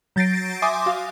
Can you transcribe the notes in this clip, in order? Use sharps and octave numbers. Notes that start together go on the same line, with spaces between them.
F#3 G6 A6 A#6 C7 D7
E5 G#5 C6 D6 D#6
F#4 F5